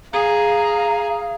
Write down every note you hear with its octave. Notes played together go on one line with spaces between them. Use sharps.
G#4 F5 A#5